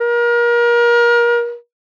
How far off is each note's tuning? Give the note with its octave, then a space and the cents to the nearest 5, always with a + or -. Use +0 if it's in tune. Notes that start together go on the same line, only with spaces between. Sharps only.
A#4 +30